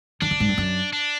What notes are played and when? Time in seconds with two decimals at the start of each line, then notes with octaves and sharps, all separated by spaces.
0.21 D#3 D4
0.31 D3
0.40 G#2
0.49 G2
0.58 F#2
0.93 D4